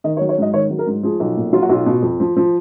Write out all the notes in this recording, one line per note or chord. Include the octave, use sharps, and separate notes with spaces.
D#3 D#5
C#5
F#3
C#5
G#2 D#5
D#3 C#5
F#3
A#4
G#2
F3 G#4
B1
A#2
F#3 F4
F#4
B1 F4
B2
F2
F3
F3